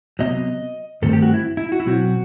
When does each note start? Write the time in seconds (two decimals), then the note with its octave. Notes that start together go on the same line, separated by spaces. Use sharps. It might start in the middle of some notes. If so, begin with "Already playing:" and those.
0.19 C3 F#3 B3 D#5
1.02 G2 D#3 A3 C4 A4
1.13 G4
1.22 F#4
1.34 E4
1.57 E4
1.72 F#4
1.80 E4
1.86 B2 F#3 C4 F#4